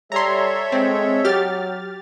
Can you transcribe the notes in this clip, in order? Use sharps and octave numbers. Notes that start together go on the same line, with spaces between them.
G3 A4 C#5 E5 A#5 C6
G#3 C4
F#3 G4 F6 A6